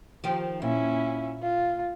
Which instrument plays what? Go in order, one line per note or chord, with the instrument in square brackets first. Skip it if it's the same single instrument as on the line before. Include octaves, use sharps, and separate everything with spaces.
[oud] D#3 F3 G4
[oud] A#2 [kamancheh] C#4 E4
[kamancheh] F4